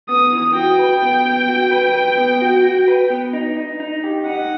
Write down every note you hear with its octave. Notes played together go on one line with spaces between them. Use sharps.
B3 D#6
E3
F#4 G5
B4
B3
B3
F#4
B4
B4
B3
F#4
F#4
B4
B3
D#4
D#4
D#4
G4
D#4 F#5